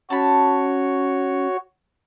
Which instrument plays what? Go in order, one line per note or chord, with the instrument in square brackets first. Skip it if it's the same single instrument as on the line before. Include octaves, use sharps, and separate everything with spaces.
[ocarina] C#4 [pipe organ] F#4 C#5 [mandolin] A5 B5